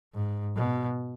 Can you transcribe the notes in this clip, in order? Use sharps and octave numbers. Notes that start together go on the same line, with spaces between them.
G#2
B2